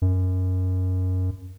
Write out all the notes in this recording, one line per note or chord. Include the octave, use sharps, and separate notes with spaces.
F#2